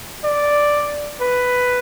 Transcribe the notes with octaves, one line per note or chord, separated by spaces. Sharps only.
D5
B4